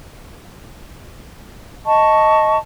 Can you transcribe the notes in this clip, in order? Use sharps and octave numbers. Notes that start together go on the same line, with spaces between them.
D#5 A5 C#6